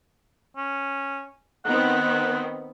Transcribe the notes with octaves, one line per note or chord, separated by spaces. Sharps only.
C#4
D#3 B3 C4 F#5